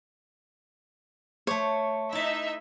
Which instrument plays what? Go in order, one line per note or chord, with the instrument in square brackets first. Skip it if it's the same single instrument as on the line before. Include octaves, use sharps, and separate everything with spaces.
[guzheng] A3 C5 [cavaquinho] C#5
[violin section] D#4 E5 [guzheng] E4 A5